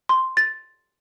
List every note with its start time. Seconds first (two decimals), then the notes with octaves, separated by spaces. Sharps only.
0.09 C6
0.37 A6